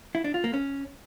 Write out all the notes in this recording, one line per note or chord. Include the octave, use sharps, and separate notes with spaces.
E4
D4
F4
A#3
C#4